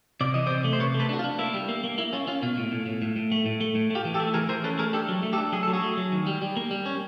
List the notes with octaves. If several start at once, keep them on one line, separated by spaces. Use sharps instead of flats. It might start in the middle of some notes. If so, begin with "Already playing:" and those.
C3 D5
E3 D#5
C3 C5 D5
A3
C5
C3 B4 C#5
A3
A4 B4
D4 F#4
F4
D4
A#3 E4
G3
A#3
A#3
A#3 E4
C#4 F4
C#4 F4
B2 F4
A2
A2
A2
A2
A2
A3
A2
A3
A2
A3 F4 G4
E3
G4 A4
A3
E3 G#4 A#4
E3 A#4 C5
C#4 A4 B4
A3 G#4 A#4
D4 G4 A4
F#3
A3
G4 A4
D4
F#3 G#4
F#3 A4
F#4 G#4
A3
F#3
D#3
G3
G3
A#3
G3
C#4